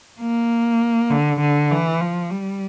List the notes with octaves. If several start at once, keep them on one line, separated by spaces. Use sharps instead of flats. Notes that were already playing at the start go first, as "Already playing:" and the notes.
A#3
D3
D3
E3
F3
G3